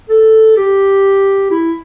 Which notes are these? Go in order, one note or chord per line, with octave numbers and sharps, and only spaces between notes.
A4
G4
E4